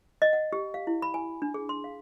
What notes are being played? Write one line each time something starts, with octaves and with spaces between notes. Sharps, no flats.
D#5
F#5
G4
F5
E4
B5
G#5
D4
G#4
C6
F5